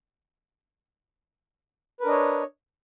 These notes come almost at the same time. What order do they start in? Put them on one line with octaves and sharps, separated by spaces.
B4 A#4 D4 D#5 C#5